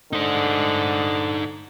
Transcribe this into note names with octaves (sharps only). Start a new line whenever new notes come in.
D3 D#4 C5